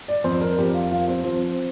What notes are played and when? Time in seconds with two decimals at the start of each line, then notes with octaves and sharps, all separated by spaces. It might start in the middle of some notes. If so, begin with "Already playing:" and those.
0.08 D5
0.24 F2 C5
0.41 A#4
0.58 F2 G4
0.74 F4
0.91 F3 F4
1.08 C4
1.24 F3 C4